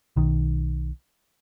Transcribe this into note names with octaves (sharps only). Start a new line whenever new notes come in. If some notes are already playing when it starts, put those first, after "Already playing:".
B1 D#3